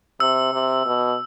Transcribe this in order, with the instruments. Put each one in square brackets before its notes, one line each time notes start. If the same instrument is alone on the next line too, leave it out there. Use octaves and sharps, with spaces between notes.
[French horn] C3 [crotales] E6
[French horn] C3
B2